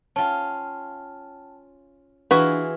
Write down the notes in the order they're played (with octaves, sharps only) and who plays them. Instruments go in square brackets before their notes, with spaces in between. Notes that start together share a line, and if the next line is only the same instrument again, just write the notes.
[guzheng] C#4 F4 [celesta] G5 A5
[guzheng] E3 F4 G#4 [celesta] D4 [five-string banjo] F#4 B4